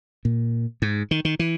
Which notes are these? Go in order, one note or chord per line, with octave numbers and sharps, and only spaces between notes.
A#2
G#2
D#3
D#3
E3